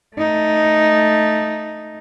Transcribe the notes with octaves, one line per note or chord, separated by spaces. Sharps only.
A3 D#4